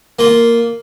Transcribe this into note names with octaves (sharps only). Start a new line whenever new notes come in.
A#3 F4